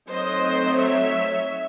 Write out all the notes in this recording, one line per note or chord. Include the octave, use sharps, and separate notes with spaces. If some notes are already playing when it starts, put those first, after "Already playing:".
F#3 A3 C4 D#4 C5 D#5
C#5 E5